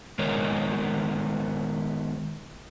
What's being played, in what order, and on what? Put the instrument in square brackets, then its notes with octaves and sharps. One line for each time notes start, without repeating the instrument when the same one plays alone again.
[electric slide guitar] D#3 G#3 B3 D#4 A#4 C#5